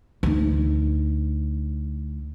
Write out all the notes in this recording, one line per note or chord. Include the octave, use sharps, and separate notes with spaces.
D2 D#4